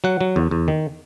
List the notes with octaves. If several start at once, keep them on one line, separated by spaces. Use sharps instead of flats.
F#3 F#5
F#3
E2
E2
D#3